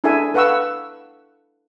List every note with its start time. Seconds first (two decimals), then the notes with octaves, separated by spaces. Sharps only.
0.04 D4 E4 G#4 A4 E5 G#5
0.34 A4 B4 F5 F#5 C#6 E6